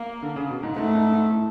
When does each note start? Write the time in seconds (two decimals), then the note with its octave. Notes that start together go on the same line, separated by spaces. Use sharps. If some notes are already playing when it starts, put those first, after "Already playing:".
Already playing: A#3
0.23 D3
0.36 C#3
0.50 B2
0.63 G#2
0.76 G#2 A3
0.95 G#2
1.12 G#2
1.30 A2